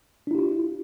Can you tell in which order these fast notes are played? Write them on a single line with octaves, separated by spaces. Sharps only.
D4 E4 G4 F4